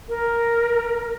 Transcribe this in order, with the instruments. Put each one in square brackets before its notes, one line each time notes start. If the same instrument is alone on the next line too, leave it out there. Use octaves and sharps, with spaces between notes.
[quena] A#4